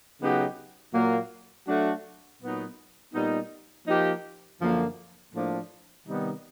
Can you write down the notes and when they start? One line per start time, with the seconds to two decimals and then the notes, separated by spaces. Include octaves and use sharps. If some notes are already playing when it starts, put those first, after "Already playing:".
0.21 C#3 F#3 B3 D#4 G4
0.94 A#2 F#3 A#3
1.67 F#3 A3 D4 F#4
2.41 A#2 F#3 B3 D#4
3.13 A#2 G3 B3 D#4
3.87 F3 A#3 D#4 G4
4.60 F#2 D3 F3 A#3
5.33 A2 F3 A#3 D4 F4
6.07 C3 D#3 G3 B3 D#4